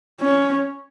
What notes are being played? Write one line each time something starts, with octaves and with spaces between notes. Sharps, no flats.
C#4